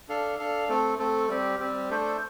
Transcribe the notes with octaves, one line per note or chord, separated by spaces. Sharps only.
D4 A4 F5
D4 A4 F5
A3 C4 A4
A3 C4 A4
G3 C4 G4
G3 C4 G4
A3 D4 A4 C5